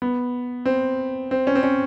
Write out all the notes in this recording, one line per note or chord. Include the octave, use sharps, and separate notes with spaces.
B3
C4
C4
C#4
C4
C#4